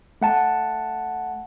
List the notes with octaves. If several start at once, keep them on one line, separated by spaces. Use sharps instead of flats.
A3 F#5 A5